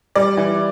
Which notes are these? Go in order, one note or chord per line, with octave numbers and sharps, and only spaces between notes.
G3 D5
E3